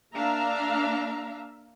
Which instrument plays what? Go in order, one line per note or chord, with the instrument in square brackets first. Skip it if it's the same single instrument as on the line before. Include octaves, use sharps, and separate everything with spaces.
[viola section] A#3 D4 E5 F5 A#5